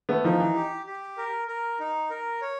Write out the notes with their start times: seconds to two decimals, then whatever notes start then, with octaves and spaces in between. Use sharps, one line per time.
0.09 A3 B3
0.24 D#3 F3 D#4
0.40 E3
0.55 G4
0.86 G4
1.17 A#4
1.48 A#4
1.80 D#4
2.10 A#4
2.41 C#5